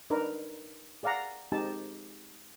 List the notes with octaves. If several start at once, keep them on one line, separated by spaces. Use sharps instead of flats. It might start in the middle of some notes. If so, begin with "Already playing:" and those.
D4 D#4 A#4 B4
G#4 D5 F5 F#5 A#5
G#3 C4 D#4 G4 A5